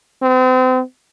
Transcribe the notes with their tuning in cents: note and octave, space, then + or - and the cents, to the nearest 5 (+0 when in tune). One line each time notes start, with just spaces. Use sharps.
C4 -35